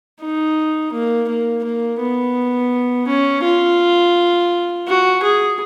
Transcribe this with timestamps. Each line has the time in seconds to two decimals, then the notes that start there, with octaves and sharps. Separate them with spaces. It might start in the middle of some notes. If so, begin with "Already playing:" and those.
0.21 D#4
0.93 A#3
1.29 A#3
1.64 A#3
2.00 B3
3.07 C#4
3.43 F4
4.87 F#4
5.23 G#4